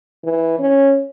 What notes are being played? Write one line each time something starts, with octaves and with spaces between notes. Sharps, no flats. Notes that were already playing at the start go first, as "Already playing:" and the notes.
E3
C#4